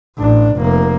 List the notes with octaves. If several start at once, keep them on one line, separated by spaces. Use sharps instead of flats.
A1 D4
F1 A#3